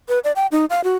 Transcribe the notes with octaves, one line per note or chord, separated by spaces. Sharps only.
B4
D5
G5
D#4
F5
F#4